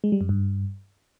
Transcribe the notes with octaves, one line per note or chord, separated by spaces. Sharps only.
G#3
G3
F#2
G2